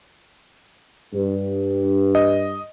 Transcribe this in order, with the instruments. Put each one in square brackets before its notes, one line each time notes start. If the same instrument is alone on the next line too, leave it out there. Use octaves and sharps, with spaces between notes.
[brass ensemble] G2
[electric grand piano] D#5